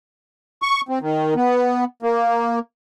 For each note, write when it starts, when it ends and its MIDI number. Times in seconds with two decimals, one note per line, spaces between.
0.62 0.81 85
0.89 0.99 60
1.01 1.34 51
1.36 1.84 59
2.03 2.59 58